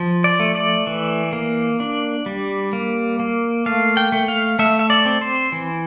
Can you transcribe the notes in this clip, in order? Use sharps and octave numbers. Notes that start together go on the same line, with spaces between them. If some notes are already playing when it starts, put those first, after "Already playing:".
Already playing: F3
D5
A3
D5
E3
A#3
D4
G3
A#3
A#3
A3 F5
G5
A3
F5
A3 E5
E5
D5
C4
C5
E3